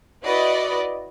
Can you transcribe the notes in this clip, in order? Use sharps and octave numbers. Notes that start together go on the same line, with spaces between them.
E4 F#4 B4 D5 D#5